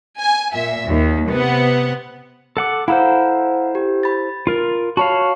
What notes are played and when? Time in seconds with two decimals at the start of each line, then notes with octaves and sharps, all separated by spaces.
0.18 G#5
0.54 A#2 E5
0.89 D#2
1.31 C3 B3 F#5
2.57 A4 F#5 D6
2.88 E4 A4 C5 F5 F#5 A#5
3.75 G4
4.03 B5 A6
4.47 F4 A#4
4.97 F#4 C#5 F5 A5 B5